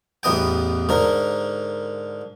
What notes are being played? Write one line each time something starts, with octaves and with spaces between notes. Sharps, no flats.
A1 E2 B3 D#5 G5
G#2 D3 A#4